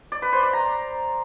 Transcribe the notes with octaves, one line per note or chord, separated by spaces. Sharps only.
D5
B4
C5
D5
A#5